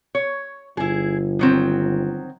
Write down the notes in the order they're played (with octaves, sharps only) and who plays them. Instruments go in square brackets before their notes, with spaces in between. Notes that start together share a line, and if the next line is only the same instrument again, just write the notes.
[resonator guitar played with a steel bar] C#5
[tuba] G1 [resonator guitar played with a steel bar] E4 G#4
[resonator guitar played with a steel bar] D#3 F#3 C4